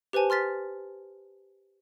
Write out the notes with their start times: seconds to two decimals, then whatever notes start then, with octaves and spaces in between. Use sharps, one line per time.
0.13 G4 B4 C5 G#5 A5
0.30 C6 F6 A6 B6